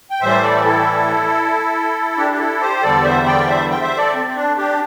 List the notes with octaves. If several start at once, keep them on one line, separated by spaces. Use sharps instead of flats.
G5
A2 E3 G3 C5 E5
A4 D5
E4 A4
D4 G4
G4
E4 A4
G4 C5
E2 D3 G3 A4 D5
C5 E5
D5 G5
C5 E5
G5
C5 E5
A4 D5
C4
C4
D4
D4 G4